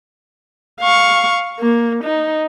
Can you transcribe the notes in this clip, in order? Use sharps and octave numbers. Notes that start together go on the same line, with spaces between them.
F5 C#6
A#3
D#4